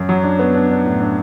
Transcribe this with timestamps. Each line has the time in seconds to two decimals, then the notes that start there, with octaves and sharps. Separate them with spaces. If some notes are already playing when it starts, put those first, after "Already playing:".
Already playing: F#2
0.09 F#3
0.24 D4
0.39 B3
0.54 D4
0.71 D4
0.85 A2
1.01 D4